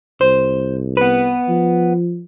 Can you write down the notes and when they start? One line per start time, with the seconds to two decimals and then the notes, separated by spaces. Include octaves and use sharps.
0.21 C2 C5
0.97 B3 B4
1.48 F3